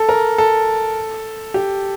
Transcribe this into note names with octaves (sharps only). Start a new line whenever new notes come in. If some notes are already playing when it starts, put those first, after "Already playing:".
Already playing: A4
A#4
A4
G4